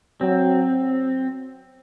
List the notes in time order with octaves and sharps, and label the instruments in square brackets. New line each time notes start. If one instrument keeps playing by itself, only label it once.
[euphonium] F#3 [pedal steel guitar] C4